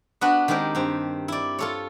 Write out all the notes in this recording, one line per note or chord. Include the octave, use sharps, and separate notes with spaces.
B3 D4 F#4 B4
D#3 G#3 C4 G4 A#4
G2 C4
E4 D5
F4 A4 C#5